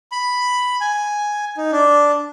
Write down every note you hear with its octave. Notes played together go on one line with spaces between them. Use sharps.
B5
G#5
D#4
D4